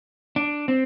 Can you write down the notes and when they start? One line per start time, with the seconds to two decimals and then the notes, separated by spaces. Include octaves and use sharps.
0.36 D4
0.68 C4